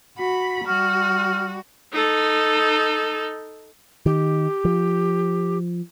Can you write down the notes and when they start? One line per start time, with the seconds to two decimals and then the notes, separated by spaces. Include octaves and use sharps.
0.18 F#4 B5
0.67 G3 F#4 F6
1.93 D#4 A4
4.06 D#3 G4
4.65 F3